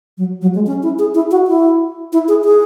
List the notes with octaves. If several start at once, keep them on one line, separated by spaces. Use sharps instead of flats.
F#3
F#3
G#3
C#4
E4
G#4
E4
F#4
E4
E4
G#4
G#4